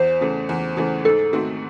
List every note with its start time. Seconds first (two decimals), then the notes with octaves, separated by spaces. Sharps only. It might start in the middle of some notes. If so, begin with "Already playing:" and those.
Already playing: E2 C5
0.21 C#3 E3 A3
0.49 E2
0.77 C#3 E3 A3
1.05 G#2 A4
1.33 D#3 A3 C4 F#4